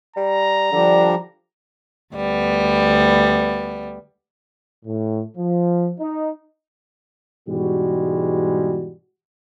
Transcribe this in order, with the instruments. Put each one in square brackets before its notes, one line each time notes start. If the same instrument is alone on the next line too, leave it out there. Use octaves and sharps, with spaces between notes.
[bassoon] G3 [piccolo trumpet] A#5
[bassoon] D3 [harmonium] F3 G3 D4
[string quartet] D2 G3 B3
[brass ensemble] A2
F3
D#4
G#2 B2 E3 G3 G#3 F#4